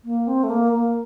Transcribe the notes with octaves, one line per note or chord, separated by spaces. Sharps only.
A#3
C4
A3
A#3
A#3